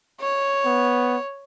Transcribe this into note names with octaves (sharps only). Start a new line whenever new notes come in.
C#5
B3